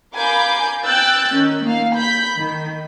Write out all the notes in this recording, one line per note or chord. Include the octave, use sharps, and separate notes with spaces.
A#4 F5 G#5 B5 D6 G6
G5 E6 F#6 G6 A6
D#3 C#4
A#3 F5
B5 G6 B6
D#3